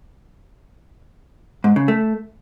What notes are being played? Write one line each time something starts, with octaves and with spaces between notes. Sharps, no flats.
G#2
C#3
A3